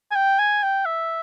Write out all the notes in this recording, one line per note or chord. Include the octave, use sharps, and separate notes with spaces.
G#5
G5
G#5
G5
E5